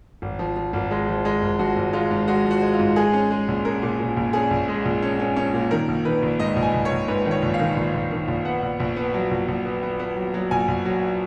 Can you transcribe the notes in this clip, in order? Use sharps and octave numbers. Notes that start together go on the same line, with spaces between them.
G#1
F3
F3
G#1
G#3
F3
G#3
G#1
F3 F#4
G#1
G#3 F4
G#2
G#3 F#4
F3
F#4
G#3
F4
G#2
G#3 G#4
C#4
G#3
A#1
C#4 A#4
A#2
A#2
A#1
C#4 G#4
A#1
G#3
A#1
C#4
C#4
C#4
A#2
D#3 A#4
A#1
D#3 B4
A#1
G#2 D#5
A#1
G#5
A#1
C#5
A#1
G#2 B4
D#3
C#5
A#1
F5
D#3
A#1
A#1
D#3
A#1
B3 F#5
A#1
A#1
B3
F#3
A#1
A#1
B3
B3
B3
F#3
F#3
A#1 G#5
A#1
F#3